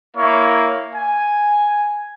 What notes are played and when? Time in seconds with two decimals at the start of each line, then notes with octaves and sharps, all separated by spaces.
0.16 A#3 E4 C#5
0.95 G#5